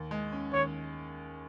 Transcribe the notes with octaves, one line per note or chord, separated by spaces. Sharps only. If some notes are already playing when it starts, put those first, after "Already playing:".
Already playing: D#2
G#3
C#4
D#2 C#5